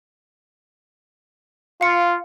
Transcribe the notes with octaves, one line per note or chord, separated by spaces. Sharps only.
F4 F5 C#7